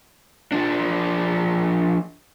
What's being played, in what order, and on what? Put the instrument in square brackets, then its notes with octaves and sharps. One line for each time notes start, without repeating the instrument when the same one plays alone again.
[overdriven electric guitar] F3 D4